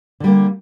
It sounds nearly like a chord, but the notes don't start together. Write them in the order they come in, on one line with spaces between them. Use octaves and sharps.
D3 G3 A#3